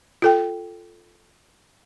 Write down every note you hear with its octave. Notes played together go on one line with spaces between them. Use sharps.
F4 A4 G5